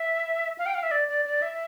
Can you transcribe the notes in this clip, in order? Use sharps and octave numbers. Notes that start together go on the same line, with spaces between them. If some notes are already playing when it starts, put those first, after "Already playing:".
Already playing: E5
F5
G5
F5
E5
D5
D5
D5
E5